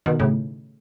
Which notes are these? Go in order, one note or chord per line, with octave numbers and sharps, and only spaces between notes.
B2 D#3
A2 C#3